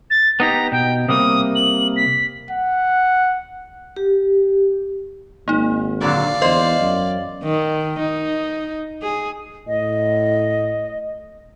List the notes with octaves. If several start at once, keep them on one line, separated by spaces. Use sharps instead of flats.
A6
B3 D#4 G4 A#5
B2 G5
C3 G3 A#3 D#6
F#7
B6
F#5
G4
G#1 A#3 D#4
A#2 D3 F#3 D5 F5
E2 C5 D#5 F#7
F#2
D#3
D#4
G#4
A2 D#5